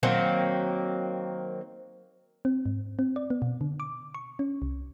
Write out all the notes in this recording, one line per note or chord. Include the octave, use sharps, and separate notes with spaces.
D#3 F#3 A#3 C4
C4
G#2
C4
D5
B3
B2
D3
D6
C#6
C#4
C2